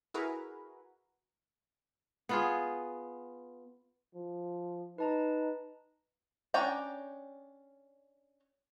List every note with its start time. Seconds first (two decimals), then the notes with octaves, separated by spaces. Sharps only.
0.14 E4 F#4 G#4 A#4 B4
2.29 B3 F4 G#4
4.14 F3
4.98 D#4 B4 A5 A#5
6.54 C#4 D4 D5 G5 A#5